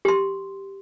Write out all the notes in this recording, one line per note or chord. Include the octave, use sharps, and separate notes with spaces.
G4 C6